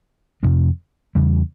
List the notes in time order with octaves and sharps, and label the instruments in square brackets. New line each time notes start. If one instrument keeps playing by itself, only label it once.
[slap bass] F2 C3 F3 C4
E2 C#3 G3